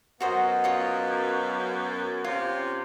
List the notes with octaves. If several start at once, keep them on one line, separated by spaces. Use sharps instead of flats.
F#2 B3 F#4 C5 D#5
F4 C#5 D#5
C3 C#4 F4